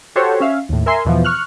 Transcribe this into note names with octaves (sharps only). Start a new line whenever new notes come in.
F#4 G4 A4 C5 C#5
C#4 E5 F5
D#2 A2
A#4 E5 G#5 C6
E2 B2 E3 F3
C#6 F6 F#6